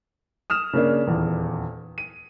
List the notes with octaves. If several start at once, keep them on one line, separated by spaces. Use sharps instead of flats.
D#6 F6 E7
C#3 A#3 D4
D#1 E2
D#7